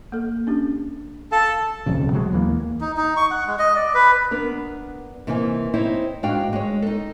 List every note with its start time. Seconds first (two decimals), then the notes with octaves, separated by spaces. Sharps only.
0.12 A#3 A4
0.47 C#4 D4 G4
1.32 A4 F5 A5
1.86 D#1 B1 F2 C#3
2.13 C3 F#3 G#3
2.32 D#2 E3 A3 A#3
2.81 D#4
2.97 D#4
3.17 C#6
3.31 F#5
3.46 G#3
3.59 D#5
3.76 D5
3.94 B4
4.31 B3 D4 A#4
5.27 C3 E3 A#3 D#4 F5 G#5
5.74 C4 D#4 E4 C5 C#5
6.23 G#2 D4 F#4 F5 G5
6.53 G#3 C#5
6.82 D#4 A4